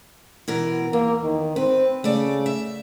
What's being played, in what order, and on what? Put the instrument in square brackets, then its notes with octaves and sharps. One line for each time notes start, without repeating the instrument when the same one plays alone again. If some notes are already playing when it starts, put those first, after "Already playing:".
[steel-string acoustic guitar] B2 E3 A#4
[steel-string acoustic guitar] E2 [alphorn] A#3
[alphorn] D#3
[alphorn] C4 [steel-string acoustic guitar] B4
[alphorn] C#3 [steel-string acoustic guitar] A3 D5
[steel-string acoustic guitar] E5